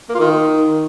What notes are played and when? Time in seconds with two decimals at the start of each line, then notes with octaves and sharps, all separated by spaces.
0.09 A#3
0.15 F4
0.20 D#3